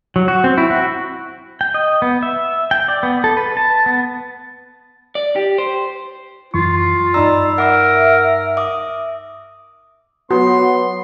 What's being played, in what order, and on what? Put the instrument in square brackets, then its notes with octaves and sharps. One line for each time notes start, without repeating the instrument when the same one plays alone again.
[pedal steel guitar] F#3
F#4
C4
E4
F#4
G5
D#5
B3
E5
G5
D5
B3
A4
B4
A5
B3
[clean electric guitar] D5
G4
C5
[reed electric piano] F#2 E3 C#6 [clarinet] F4
[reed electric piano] G2 D#4 A#5 [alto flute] D5 [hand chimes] B5 E6
[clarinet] A#4 [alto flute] E5 [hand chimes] F#5 D6 E6
[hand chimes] E5 D6 D#6
[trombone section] F#3 B3 [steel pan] F#4 [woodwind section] C6